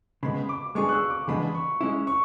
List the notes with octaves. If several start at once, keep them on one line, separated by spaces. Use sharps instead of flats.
C#3 G#3 B3 B5
D6
G#3 B3 D4 G#4 C#6
F#6
E6
D6
C#3 E3 G#3 B3 D4 B5
C#6
G#3 C#4 E4
C#6